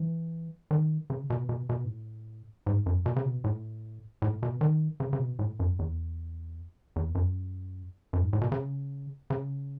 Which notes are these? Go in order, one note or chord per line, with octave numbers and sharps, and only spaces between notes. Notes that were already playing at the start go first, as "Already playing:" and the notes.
Already playing: E3
D#3
C#3
B2
B2
B2
G#2
A2
G#2
F#2
B2
C#3
B2
A2
A2
B2
D#3
C#3
C#3
B2
A2
F#2
E2
E2
F#2
F#2
G#2
A2
B2
C#3
C#3